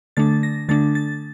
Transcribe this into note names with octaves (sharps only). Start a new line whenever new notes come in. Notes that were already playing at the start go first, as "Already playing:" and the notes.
D3 A3 D4 A6
A#6
D3 A3 D4 A6
A6